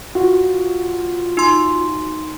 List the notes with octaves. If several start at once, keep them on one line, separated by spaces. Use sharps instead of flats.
F4 F#4
D#4 C6